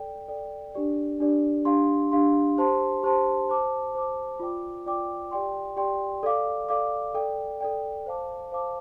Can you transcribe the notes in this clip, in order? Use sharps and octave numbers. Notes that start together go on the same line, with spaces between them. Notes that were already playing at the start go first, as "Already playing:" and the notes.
Already playing: A4 D5 G5
A4 D5 G5
D4 G4 D5
D4 G4 D5
D4 G4 F5 C6
D4 G4 F5 C6
G4 C5 A5 C6
G4 C5 A5 C6
C5 A5 D6
C5 A5 D6
F4 D5 G5 D6
F4 D5 G5 D6
G4 D5 G5 C6
G4 D5 G5 C6
A4 D5 F5 D6
A4 D5 F5 D6
A4 D5 G5
A4 D5 G5
C5 F5 A5 D6
C5 F5 A5 D6